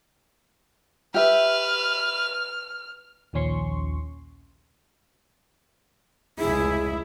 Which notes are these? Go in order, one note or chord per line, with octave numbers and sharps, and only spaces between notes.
G4 B4 E5 F6
A#1 D#2 F3 C#4 C6 C#6
F1 C#2 E4 G#4